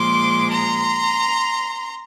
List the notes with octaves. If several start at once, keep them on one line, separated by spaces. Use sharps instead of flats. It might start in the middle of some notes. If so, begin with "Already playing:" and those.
Already playing: A#2 F3 G#3 C6 D6
A#5 C6